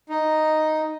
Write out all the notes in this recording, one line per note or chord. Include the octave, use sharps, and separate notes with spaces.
D#4